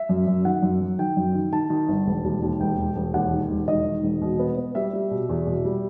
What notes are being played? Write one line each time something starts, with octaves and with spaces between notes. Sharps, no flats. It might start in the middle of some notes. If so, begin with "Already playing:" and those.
Already playing: E5
F#2
F#2
D#3 F#5
F#2
F#3
D#3 G5
F#2
D#3
D#3 A5
D#3
G1
E1
D#2
D#2
E1 G5
E1
E1
D#2 F#5
D#3
E1
D#3 D#5
D#3
E1
B2
B3
B3
G3 E5
G3
B2
E2
B2
G3